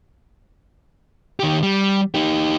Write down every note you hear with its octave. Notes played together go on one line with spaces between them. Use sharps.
D#3 G4
G3
D#4 G4